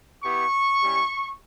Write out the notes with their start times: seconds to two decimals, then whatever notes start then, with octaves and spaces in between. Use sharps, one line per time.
0.24 B3 E4 G4 C#6
0.81 G3 C#4 E4 G4